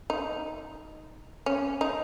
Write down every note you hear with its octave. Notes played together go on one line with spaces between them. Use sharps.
D#4
C#4
D#4